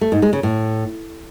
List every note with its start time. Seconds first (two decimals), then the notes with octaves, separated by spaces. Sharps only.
0.01 A3
0.12 G#2
0.22 G#3
0.33 C#3
0.43 A2